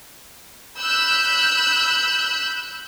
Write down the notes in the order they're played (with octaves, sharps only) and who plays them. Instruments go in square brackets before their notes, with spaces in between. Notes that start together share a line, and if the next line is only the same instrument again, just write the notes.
[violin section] B5 E6 F#6 G6